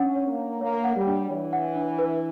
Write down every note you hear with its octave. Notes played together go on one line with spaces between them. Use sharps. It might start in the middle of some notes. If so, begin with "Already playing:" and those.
Already playing: C#4 D4 F#5
C#5
A#3
C#5
A#3 C#5
F#5
G3
D4
E3 C#5
F#5
D4
B4